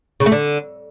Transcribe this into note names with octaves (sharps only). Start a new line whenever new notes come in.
C#3
A3
D3